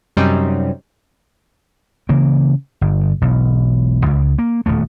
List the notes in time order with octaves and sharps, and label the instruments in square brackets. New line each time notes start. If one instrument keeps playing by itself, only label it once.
[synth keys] F#2 C3 G3 C4 C#4 D#4
[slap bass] C#3 E3 A#3
G1
E1 B1
C#2
A#3
D#1 E2 A3